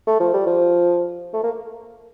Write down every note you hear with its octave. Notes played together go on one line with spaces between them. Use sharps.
A3
F3
G3
F3
A3
A#3